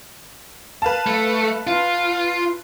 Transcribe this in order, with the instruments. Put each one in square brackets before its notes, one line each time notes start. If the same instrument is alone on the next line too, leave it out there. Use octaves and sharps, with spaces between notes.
[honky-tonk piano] B4 F5 A5
[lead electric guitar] A3
F4